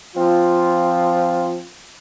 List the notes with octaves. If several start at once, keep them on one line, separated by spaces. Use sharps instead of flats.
F3 C4 F4